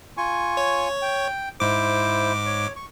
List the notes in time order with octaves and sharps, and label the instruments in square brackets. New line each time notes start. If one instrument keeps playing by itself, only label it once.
[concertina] F4 G#5 C#6
[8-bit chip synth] C#5
[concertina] G5
[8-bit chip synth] G#2 D6 [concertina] E4 C5
[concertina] C#5
C#6